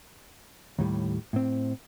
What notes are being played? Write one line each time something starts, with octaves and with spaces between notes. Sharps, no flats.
D#2 A2 G3
A2 C4